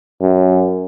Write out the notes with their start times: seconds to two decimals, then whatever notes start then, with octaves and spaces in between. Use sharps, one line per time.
0.21 F#2